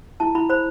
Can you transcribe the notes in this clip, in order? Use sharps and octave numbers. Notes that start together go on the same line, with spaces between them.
E4 A5
E4 B5
C5 B5